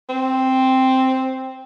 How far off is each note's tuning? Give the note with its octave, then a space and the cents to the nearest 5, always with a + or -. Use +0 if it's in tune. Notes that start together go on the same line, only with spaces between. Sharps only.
C4 +0